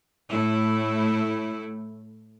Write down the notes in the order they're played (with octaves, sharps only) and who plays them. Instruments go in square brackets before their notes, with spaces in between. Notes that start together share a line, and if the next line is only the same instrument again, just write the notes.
[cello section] A2 A3 E4